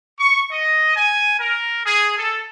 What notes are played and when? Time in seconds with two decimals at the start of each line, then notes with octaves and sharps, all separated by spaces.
0.19 C#6
0.50 D#5
0.95 G#5
1.39 A#4
1.84 G#4
2.18 A4